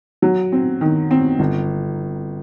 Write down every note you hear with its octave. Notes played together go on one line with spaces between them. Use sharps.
F#3
C4
D#3
C4
G1